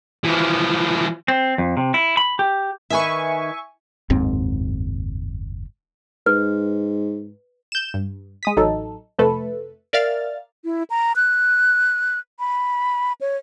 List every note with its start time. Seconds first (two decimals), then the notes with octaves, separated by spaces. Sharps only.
0.24 E3 F3
1.28 C4
1.58 F2
1.77 C3
1.94 E4
2.17 B5
2.39 G4
2.90 D#3 B4 E5 G#5 C#6
4.10 F#1 D#2 G#2 C4
6.26 G#2 B4
7.72 G6 E7
7.94 G2
8.43 G#3 D#6 B6
8.57 A1 F#3 D#4 A4
9.18 F2 C3 A3 A4 B4
9.93 A#4 D5 E5 F5 F6 A6
10.65 E4
10.90 A#5
11.16 F#6
12.39 B5
13.21 C#5